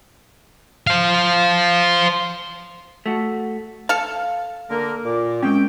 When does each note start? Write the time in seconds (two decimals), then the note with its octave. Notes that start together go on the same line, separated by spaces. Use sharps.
0.87 C5 F5
3.06 A3 F#4
3.89 A4 F5 A5
4.70 D3 A#3 A#4
5.05 A#2 D6
5.43 G#3 C4 C#4 G5